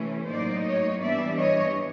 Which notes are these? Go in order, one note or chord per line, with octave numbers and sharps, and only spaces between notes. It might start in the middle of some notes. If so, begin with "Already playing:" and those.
Already playing: C3 E3 A3 C#4 E4
A2 F#3 A#3 D#4 C5 D5
C#5 D#5
E3 G3 B3 D4 D5 E5
C#5 D#5